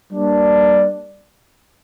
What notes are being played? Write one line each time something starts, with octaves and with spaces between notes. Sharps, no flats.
G3 A#3 D4